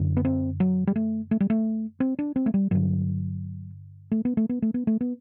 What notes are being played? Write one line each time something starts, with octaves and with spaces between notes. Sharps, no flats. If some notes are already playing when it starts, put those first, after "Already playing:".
Already playing: F#2 D3
B3
C4
F#3
G3
A3
A3
G3
A3
C4
D4
C4
A3
G3
G2 D3 F#3
A3
B3
A3
B3
A3
B3
A3
B3